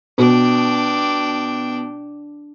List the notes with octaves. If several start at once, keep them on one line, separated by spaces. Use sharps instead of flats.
B2 D4 G5